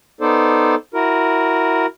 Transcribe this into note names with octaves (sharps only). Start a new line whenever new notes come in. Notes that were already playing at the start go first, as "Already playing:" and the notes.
B3 D#4 A4 C5 D5
E4 F#4 A#4